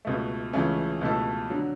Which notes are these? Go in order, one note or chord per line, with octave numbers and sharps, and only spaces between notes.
C#2 B2 A3
C#2 C#3 E3 A3 C#4
C#2 B2 A3 E4 A4
D3 F#3